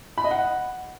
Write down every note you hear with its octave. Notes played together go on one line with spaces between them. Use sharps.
B5
D#5
F#5